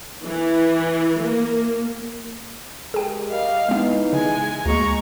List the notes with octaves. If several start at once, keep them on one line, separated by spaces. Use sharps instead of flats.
E3
A#3
G#3 G4 G#4 A#4 G5
G3 D#5 F5
E3 G#3 B3 D#4
C#3 G#3 G#5
D2 G#3 A#3 A#5 C#6